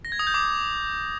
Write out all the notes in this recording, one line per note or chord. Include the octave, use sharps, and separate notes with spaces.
A#6
G#6
D#6
G6
D6